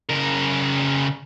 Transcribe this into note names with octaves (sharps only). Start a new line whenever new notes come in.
C#3 A#4